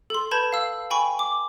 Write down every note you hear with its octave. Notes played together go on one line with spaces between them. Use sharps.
A4 C6
B4 A5 B5 G6 G#6
F5 E6
G5 G#5 B5 C#6
D6